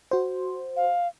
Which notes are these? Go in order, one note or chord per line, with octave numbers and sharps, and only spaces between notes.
F#4 C5
F5